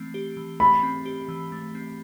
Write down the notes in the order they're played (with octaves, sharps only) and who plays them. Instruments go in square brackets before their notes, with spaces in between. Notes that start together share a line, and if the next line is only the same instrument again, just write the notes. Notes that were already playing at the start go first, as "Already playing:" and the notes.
Already playing: [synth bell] E3 A3 C4
G4
E3
[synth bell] A3 [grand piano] B5
[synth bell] C4
G4
E3
A3
C4